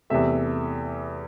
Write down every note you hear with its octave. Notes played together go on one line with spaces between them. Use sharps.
E2 C3 A3 E5